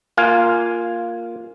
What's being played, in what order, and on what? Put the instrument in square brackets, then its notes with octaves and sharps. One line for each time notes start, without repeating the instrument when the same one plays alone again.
[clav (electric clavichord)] A#3 F4 F5 G#5